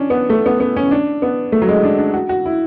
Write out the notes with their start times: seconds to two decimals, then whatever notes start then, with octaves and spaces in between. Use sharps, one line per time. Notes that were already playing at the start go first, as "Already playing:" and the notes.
Already playing: C#4 D4
0.10 B3
0.30 A3
0.46 B3
0.60 B3
0.76 C#4
0.91 D4
1.22 B3
1.52 A3
1.62 F#3
1.69 G#3
1.83 D4
1.98 D4
2.14 F#4
2.29 F#4
2.45 E4